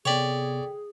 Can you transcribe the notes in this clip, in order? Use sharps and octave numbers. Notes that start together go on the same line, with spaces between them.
C3 B3 G#4 A4 C#5 D5 G5 B6